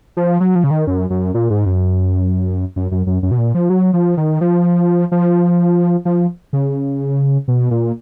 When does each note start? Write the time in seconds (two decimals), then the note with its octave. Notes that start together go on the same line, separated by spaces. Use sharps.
0.17 F3
0.40 F#3
0.55 F3
0.64 C#3
0.71 D#3
0.87 F#2
1.10 F#2
1.34 A#2
1.50 G#2
1.66 F#2
2.76 F#2
2.91 F#2
3.07 F#2
3.23 F#2
3.31 B2
3.38 A#2
3.55 F3
3.70 F#3
3.93 F3
4.17 D#3
4.41 F3
5.12 F3
6.05 F3
6.53 C#3
7.48 B2
7.71 A#2